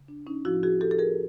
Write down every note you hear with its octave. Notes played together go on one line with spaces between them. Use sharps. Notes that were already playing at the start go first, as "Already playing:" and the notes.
Already playing: C#3
D4
C#4 D#4
A2 F3 E4 F#4
F#4 G#4
G4 A4
A4
G#4 A#4